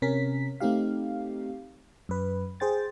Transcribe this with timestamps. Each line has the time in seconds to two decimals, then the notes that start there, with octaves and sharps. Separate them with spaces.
0.02 C3 C#4 A#4 B6
0.60 A3 C4 D#4 G4 F5
2.09 F#2 B4
2.60 G#4 C5 G5 A6